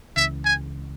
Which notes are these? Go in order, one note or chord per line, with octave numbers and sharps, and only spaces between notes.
C#2 C#3 E3 E5
G#5